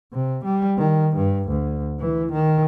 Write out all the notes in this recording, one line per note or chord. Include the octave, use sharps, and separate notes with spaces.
C3
G3
D#3
G2
D2
E3
D#3